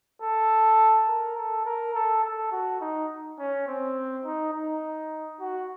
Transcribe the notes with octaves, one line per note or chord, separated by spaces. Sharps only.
A4
A#4
A4
A#4
A4
A4
F#4
D#4
C#4
C4
D#4
D#4
F#4